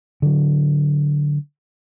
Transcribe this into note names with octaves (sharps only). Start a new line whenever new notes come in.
D3 F#3